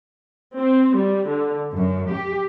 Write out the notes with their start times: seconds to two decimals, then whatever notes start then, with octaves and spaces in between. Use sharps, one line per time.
0.58 C4
0.97 G3
1.29 D3
1.74 F#2
2.11 G4